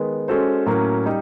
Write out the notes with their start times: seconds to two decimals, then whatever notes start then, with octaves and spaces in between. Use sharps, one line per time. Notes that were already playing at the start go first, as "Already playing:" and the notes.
Already playing: D#3 G#3 B3
0.28 G#3 C#4 F#4 A4 C5
0.66 A2 F#3 A#3 C#4
1.06 G3 D#4